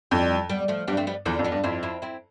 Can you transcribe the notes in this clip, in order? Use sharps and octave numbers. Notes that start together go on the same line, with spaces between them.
F2 E3 G3
G3 B3
F3 A3
G2 G3 B3
A3 C4
G3 B3
E2 D3 F3
F2
B3 D4
G2
F2 C4 E4
C4 E4
C4 E4